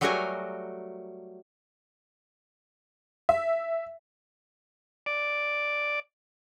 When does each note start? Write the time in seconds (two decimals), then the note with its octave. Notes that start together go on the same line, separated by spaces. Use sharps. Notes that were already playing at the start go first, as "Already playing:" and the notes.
0.01 F#3 G3 A3 F#4 A#4 G#5
3.29 E5
5.06 D5